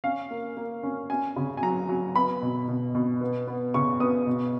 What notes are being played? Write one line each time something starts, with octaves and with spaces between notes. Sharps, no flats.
C#4 F5
A#3
A#3
C#4
C#4 G#5
C#3
G#5
F#3 A#5
F#3
B3 B5
B2
B2
B2
B3
B3
C#3 C#6
B3 D#6
B2